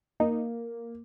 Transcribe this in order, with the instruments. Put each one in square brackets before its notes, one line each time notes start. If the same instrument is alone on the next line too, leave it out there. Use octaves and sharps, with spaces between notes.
[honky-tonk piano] A#3 [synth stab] D#4